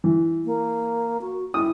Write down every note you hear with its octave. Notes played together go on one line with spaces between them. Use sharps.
E3
A#3
F#4
E4 D#6